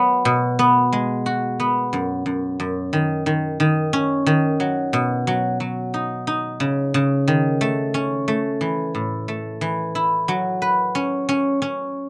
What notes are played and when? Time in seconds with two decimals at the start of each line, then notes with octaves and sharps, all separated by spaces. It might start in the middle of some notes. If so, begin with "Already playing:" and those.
Already playing: F#3 B3
0.25 B2
0.59 B3
0.93 G#3
1.26 F#4
1.60 B3
1.93 F#2
2.26 F#2
2.60 F#2
2.93 D#3
3.26 D#3
3.60 D#3
3.93 C#4
4.26 D#3
4.60 F#3
4.93 B2
5.27 F#3
5.60 F#3
5.94 D#4
6.27 D#4
6.60 C#3
6.94 C#3
7.28 D#3
7.61 A3
7.94 C#4
8.28 A3
8.61 E3
8.95 A2
9.28 A3
9.61 E3
9.95 E4
10.28 F#3
10.62 B4
10.95 C#4
11.29 C#4
11.62 C#4